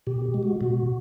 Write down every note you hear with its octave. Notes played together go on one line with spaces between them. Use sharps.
B2 G4
G4
G#3
F#4
B2 F#4